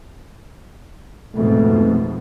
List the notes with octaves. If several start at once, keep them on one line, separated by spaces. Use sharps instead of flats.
F2 G#2 B2 A3